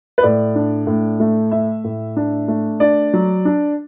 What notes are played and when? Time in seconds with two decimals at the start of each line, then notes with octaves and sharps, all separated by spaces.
0.18 B4
0.23 A2 D5
0.55 D4
0.87 A2
1.20 A3
1.51 A3 E5
1.84 A2
2.16 D4
2.48 A3
2.80 D4 D5
3.13 F#3
3.45 D4